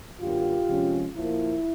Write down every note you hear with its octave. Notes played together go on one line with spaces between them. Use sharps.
F#2 D3 F#3 A#3 F4 G4
C3 F3 G#3 C#4
A#2 F3 A#3 E4